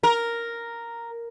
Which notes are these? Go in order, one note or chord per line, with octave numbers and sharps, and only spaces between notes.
A#4